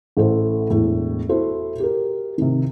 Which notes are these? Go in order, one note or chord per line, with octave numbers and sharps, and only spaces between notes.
A1 A3 E4 A4 C5
E1 A2
E4 F#4 A4 C5
G4 A#4
C3 D#3